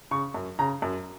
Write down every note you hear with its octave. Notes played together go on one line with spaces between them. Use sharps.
C#3 C#6
F#2
C#3 A#5
F#2